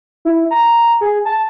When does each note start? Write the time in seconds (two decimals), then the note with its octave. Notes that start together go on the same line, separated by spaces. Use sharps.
0.25 E4
0.51 A#5
1.01 G#4
1.25 A5